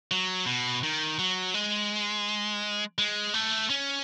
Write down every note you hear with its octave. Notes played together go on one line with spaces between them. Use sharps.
F#3
B2
D#3
F#3
G#3
G#3
A3
C#4